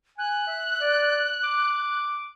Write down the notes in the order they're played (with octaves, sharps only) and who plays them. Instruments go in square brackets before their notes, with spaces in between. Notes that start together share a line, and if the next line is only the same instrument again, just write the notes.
[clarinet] G#5 [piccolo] F#6
[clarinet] E5
D5
D6